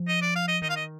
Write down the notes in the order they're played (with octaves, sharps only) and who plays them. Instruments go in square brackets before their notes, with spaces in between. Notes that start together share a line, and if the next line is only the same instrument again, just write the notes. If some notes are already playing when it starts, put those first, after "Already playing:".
Already playing: [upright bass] F3
[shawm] D#5
D5
F5
D#5
[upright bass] D#3 [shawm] D#5
[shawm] F5
D#5